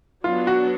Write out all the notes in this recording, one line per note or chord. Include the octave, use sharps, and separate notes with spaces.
F#3 B3 D4 F4
F#4